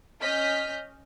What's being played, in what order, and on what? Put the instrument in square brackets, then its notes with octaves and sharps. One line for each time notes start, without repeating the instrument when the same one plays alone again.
[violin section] C#4 D#5 F6 G6 B6